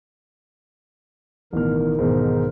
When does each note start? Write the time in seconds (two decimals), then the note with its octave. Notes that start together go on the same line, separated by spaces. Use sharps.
1.53 A1 B2 D#3 D#4 A#4 F6
1.99 B1 E2 G#2